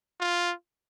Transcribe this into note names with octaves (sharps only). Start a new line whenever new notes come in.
F4